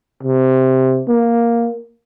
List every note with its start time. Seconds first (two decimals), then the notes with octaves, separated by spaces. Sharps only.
0.23 C3
1.08 A#3